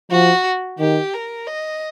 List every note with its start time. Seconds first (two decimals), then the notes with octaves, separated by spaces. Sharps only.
0.11 F3 F#4
0.79 D#3 G4
1.14 A#4
1.47 D#5